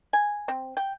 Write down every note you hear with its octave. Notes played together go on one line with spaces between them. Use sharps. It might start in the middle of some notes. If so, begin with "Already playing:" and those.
G#5
C4
G5